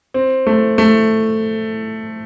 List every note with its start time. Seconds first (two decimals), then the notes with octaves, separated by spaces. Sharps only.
0.14 C4
0.47 A3
0.78 A3